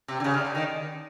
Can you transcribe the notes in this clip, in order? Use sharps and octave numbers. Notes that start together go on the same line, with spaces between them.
C3
D3
C#3
D3
D3
D#3